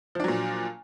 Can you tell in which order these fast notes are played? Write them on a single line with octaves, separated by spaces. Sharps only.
F3 D4 F#3 A#2